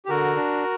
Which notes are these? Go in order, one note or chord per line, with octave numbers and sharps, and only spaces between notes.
G4
D3 F#4 A#4
D4